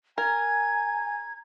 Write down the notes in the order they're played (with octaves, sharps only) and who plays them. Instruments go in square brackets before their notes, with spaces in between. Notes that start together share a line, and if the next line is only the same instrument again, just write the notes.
[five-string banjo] A#4 [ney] G#5 [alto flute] A#5 [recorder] G#6